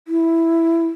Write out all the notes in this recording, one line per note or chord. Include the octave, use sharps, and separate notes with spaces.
E4